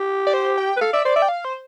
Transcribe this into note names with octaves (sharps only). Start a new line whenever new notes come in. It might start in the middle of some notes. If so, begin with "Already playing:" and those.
Already playing: G4
D5
C5
G5
B4
A4 F5
D5 E5
C5 D5
D5 E5
G5
F5
C5